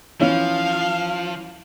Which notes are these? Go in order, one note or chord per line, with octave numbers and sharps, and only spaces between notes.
E3 F3 C#4 F5